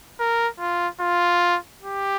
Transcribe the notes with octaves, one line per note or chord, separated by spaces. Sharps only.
A#4
F4
F4
G4